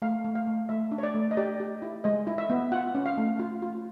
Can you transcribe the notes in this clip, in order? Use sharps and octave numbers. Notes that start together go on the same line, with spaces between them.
A3 F5
A3
F5
A3
A3 E5
D4
C#5
D5
A3
D#5
G4 D5
G4
E4
G#3 D#5
E4
E5
B3
F4 F#5
C#4
F5
A3
F4
F4